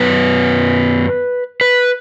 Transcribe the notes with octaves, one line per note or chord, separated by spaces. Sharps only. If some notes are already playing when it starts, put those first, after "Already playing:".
Already playing: F#2 F#3 B3 B4
B4